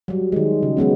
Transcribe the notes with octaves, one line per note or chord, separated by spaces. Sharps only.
F#3 G3
D#3 G#3
C#3
F#3 G#3 B3 C#4